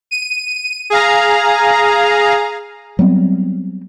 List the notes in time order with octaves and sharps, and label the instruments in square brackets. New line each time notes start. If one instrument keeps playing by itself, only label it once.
[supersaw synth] D#7
G#4 F5 A#5
[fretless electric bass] F#3 G3 B3 C4